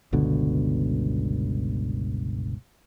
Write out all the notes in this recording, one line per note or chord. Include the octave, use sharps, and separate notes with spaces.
G1 C#2 B2 D3